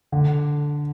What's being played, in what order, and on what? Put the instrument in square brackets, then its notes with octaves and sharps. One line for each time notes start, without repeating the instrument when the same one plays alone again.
[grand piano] D3